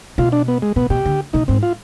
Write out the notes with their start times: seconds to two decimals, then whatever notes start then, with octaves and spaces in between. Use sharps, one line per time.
0.18 B2 F4
0.32 D4
0.48 B3
0.62 G#3
0.76 B2 B3
0.90 B2 G4
1.05 D3
1.33 B2 D#4
1.48 G#2 C4
1.63 F4